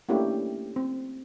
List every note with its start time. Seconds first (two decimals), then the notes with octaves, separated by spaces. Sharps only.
0.09 A3 A#3 C#4 D4 E4 G4
0.76 C4